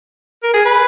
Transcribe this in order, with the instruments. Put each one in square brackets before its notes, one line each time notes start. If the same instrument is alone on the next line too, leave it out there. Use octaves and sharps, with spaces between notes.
[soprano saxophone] A#4
G#4
B4